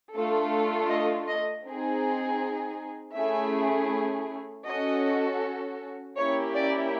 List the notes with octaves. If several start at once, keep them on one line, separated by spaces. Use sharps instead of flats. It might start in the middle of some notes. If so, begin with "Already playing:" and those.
A3 D4 F4 A4
D#5
D#5
C4 D#4 G#4
A3 C#4 E4 G#4 E5
C#4 F#4 A4 D#5
A#3 C#4 E4 G4 C#5
D5